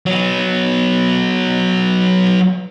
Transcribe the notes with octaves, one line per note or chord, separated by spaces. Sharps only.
F#3 B3